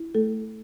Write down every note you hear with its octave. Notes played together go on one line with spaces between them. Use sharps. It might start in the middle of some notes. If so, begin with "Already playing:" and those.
Already playing: E4
A3 A4